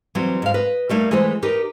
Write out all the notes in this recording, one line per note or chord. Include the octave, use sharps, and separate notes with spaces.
E3 F#3 G3 C4
G#2 F5
B4 D#5
G3 A3 A#3 D#4
E3 G#3 A3 B3 C5
D#4 G4 A#4 B4